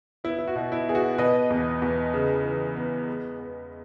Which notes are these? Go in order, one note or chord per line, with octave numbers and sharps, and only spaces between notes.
B3 E4
E4
F#4
B2
E4
B3 G#4
F#4
B2 B4 D#5
E2
E2
C#3
E3
B3
G#3
B3